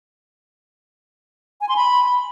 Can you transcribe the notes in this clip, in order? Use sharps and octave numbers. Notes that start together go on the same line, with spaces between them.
G#5
C6
B5